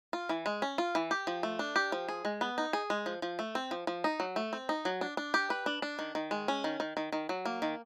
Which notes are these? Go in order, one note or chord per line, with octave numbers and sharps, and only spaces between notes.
F4
E3
G#3
C#4
F4
E3
G4
F3
A3
D4
G4
F3
G#4
G#3
B3
D#4
G#4
G#3
F3
F3
A3
C4
F3
F3
D#4
F#3
A3
C4
D#4
F#3
D4
D4
G4
B4
D4
D4
D#3
D#3
G#3
C#4
D#3
D#3
D#3
D#3
F#3
A#3
D#3